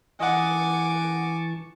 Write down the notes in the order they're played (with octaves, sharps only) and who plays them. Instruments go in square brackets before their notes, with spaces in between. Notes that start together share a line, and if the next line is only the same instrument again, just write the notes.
[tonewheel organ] E3 A5 C#6 [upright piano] D#5 F#5 [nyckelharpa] G#5 D6